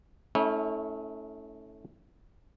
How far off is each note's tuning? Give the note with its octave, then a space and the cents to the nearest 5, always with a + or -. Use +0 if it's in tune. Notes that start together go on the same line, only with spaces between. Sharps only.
A3 +0 C#4 +0 E4 -40